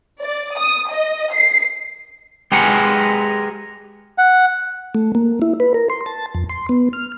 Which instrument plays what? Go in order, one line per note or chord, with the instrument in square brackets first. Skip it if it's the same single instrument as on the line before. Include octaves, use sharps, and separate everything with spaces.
[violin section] D5
D#6
D#5
C7
[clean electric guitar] G#3 G4 G#4 A#4 B4 F#5
[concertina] F#5
[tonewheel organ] A3
A#3
E4
B4
A#4
C6
A5
F2
C6
B3
F6